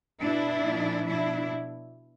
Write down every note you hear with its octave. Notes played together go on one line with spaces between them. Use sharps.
B2 D4 E4
A#2 F3
B2 D4 E4